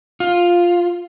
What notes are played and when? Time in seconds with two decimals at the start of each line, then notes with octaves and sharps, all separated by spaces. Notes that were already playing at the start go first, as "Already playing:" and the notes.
0.20 F4